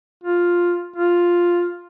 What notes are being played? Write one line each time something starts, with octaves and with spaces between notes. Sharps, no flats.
F4
F4